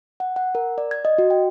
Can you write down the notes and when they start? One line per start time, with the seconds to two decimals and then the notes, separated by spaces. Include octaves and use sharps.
0.20 F#5
0.36 F#5
0.55 A#4
0.78 D5
0.91 G#6
1.05 D#5
1.18 F#4
1.30 G5